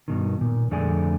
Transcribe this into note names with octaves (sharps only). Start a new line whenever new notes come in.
G2 B2 D#3
A#2
F2 D3 A3 G#4 D5 G#5